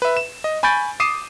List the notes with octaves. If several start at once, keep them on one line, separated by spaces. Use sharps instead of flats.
B4 E5
E7
D#5
G#5 B5 C#6 G6 A6 D7
D6 D#6 C7 D#7 E7